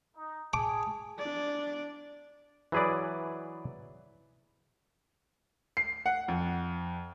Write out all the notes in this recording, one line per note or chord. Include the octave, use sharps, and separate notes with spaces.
D#4
G#4 A5 D6
D4 D5
E3 F#3 G#4 B4 D5
C7
F#5
F2